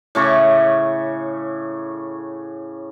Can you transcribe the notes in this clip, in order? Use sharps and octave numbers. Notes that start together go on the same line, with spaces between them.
A2 C#3 C#6 D6